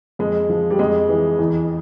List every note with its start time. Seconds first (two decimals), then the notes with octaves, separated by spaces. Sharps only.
0.19 F2 G#3
0.49 F3
0.70 G3
0.79 F2 G#3
1.09 E3
1.39 E2